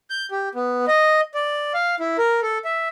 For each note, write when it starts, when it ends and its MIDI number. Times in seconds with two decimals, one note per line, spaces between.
0.10 0.26 91
0.31 0.49 67
0.55 0.85 59
0.88 1.21 75
1.34 1.73 74
1.74 1.95 77
2.00 2.17 64
2.18 2.40 70
2.42 2.58 69
2.65 2.88 76